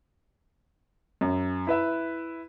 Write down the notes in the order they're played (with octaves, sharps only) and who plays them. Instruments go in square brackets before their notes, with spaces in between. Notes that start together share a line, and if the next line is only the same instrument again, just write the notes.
[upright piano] F#2
E4 B4 E5